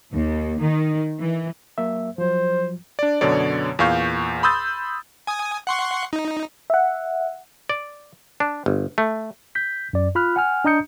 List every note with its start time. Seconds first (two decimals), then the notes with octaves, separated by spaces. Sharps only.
0.15 D#2
0.61 D#3
1.19 E3
1.78 F#3 A#3 E5
2.18 F3 F#3 C5
2.99 D4 D5
3.21 F#2 B2 D3 C#5 D5
3.79 E2 A#2 F5 C#6 G6
4.43 B5 C6 D#6 E6 G6 A6
5.27 G#5 D#6
5.67 F#5 C6 C#6
6.13 D#4
6.70 E5 F#5
7.69 D5
8.40 D4
8.66 G1
8.98 A3
9.55 G6 B6
9.93 F#2 D5
10.15 F4 B5 F6 F#6
10.36 F#5 G#5 F6
10.65 D4 D#5 A#5 D#6 G6 C#7